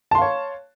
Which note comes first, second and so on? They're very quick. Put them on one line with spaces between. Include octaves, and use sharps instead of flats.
A5 C6 F5 C#5